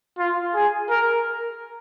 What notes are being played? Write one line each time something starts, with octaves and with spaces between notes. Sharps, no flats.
F4
G#4
A#4